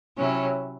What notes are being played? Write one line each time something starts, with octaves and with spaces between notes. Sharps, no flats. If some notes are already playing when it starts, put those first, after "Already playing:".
C3 F#3 C#4 E4